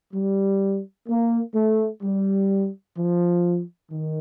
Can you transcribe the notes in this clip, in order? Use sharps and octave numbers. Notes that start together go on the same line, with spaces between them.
G3
A#3
A3
G3
F3
D#3